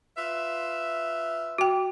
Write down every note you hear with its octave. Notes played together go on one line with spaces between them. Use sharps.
F4 B4 E5
F#4 G5